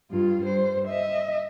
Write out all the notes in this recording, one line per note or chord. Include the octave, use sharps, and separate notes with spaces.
G2 F4
G2 C5
D#5 E5